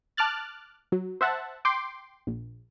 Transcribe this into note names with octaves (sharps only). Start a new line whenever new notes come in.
A5 D6 F6 F#6 A6
F#3
C5 E5 F#5 A5
G5 C6 D6
A#1